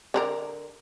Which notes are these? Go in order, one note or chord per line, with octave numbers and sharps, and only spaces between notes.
D3 D4 A#4